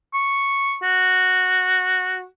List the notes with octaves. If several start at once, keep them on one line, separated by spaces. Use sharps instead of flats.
C#6
F#4